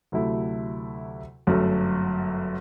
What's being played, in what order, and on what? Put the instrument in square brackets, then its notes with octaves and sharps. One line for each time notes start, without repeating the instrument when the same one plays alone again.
[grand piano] D2 C3 F#3 A3 E4
G1 F#2 F#3 A3